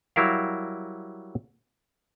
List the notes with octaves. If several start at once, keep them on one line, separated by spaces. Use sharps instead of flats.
F#3 G3 E4 A#4 F5